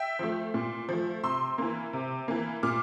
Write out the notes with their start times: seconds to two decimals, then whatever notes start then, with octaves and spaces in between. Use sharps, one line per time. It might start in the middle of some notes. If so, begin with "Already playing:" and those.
Already playing: E5 G5
0.19 F3 A3
0.54 A#2
0.89 F3 A3
1.24 C3 C6 E6
1.58 E3 A#3
1.93 C3
2.28 E3 A#3
2.63 A#2 D6 F6